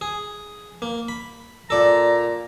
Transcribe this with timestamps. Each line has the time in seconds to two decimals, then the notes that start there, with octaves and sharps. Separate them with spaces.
0.01 G#4
0.82 A#3
1.08 B5
1.70 A#2 A4 D5 A#5